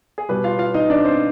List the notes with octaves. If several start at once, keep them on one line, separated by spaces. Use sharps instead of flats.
G#4
B2 G3 B3 B4
F4 F5
F4 F5
D#4 D#5
D4 D5
C4 C5